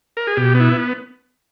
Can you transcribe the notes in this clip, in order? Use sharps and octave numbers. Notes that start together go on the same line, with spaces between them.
A#4
G#4
B2 G4
B3
E4